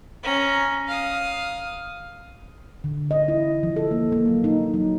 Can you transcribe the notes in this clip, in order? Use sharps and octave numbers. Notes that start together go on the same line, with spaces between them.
C#4 A#5
F5 D#6
D3
D#5
E4
F3
A4
A#3
A#3
F#3
D#4
F#3